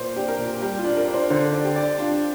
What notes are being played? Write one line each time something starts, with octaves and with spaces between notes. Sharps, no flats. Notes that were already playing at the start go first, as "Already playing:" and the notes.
Already playing: A#2 C5
D4 G4
A#4
A#2
G3 G4
F4
D4
A#4
D4
C5
D3 C5
D5
G4
D5
D4 F4